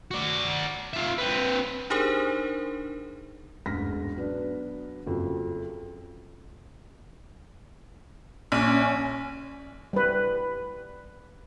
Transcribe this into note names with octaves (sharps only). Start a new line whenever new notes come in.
F#4 D5
F4 E5
C4 B4
D4 D#4 G4 G#4 A#4 C5
E1 A1 G#2 F6 A#6 B6
F#3 B3 D4
F#1 F2 F3 F#3
A#1 C#4
G3 B4